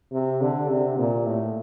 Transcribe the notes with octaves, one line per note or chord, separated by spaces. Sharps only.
C3
D3
C3
A#2
A2